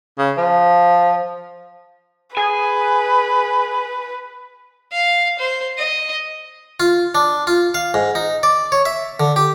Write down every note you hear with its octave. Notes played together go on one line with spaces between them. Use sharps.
C#3
F3
G#4 B4 G#5
F5
C5
D#5
F4
D4
F4
F5
G#2
D#4
D5
C#5
E5
D3
G4